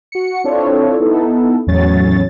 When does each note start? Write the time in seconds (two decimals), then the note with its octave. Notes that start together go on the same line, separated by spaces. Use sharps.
0.12 F#4 C#7
0.44 C4 D4 E4 F4 A4 C#5
1.00 B3 D#4 E4 A4
1.67 E2 A2 F#3 C#4 C#5 A6